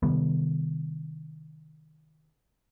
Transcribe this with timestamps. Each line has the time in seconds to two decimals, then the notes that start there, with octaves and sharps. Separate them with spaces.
0.03 C3 D#3 G3 B3